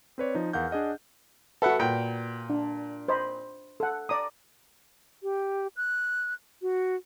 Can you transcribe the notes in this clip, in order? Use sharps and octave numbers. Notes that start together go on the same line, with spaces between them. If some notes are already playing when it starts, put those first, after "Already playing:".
C4 B4 C#5 D5
F3 D#4
E2 A#4 F5 F#5 F6 G6
D4 G#4 D#5 F#5
F#4 A4 B4 E5 F#5
A#2 G5
D4
C5 D#5 B5
A4 F#5
D5 A#5 D#6
G4
F#6
F#4